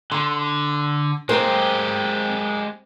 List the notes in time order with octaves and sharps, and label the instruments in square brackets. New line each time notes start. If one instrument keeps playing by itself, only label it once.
[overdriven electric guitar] D3 [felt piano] C6
[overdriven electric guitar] G#3 G4 [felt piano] A#3 [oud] C4